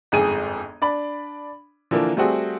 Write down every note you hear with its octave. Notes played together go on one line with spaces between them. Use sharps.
G1 F2 G#2 G#4 D#7
D4 D5 B5
D3 E3 F3 A#3
G3 A3 C4 F#4 G#4